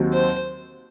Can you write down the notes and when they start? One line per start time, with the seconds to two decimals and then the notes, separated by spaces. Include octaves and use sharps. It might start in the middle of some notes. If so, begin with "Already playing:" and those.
Already playing: D#2 D#3 F#3 C4 F#4
0.14 C5